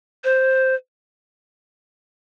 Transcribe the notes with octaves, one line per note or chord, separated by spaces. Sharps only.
C5